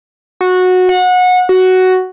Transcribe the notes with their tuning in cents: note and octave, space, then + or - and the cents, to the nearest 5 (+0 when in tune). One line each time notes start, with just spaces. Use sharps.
F#4 -15
F#5 -25
F#4 +5